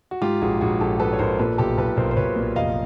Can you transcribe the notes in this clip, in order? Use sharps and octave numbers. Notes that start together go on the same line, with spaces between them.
F#4
G#2 F4 G4
A#1 F#4 G#4
A#1 F#4 G#4
A#1 G4 A4
G#2 A4 B4
C#5
A#1 A#4 C5
A#2 A4 B4
B1 G4 A4
B1 A4 B4
B1 A#4 C5
C5
B1 B4 C#5
A#2
F1 D#5 F5